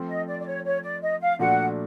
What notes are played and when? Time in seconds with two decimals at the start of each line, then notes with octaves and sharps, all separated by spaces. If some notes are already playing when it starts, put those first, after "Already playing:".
Already playing: F3 A3 C4
0.08 D#5
0.27 D5
0.40 D5
0.46 C#5
0.64 C#5
0.83 D5
1.02 D#5
1.20 F5
1.39 A#2 F3 A3 D4 F#4 F#5